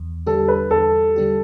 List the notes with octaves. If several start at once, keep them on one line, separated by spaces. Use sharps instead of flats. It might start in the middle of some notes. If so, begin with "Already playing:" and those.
Already playing: E2
D3 G3 D4 G4 A4
B4
E2 A4
D3 G3 D4 G4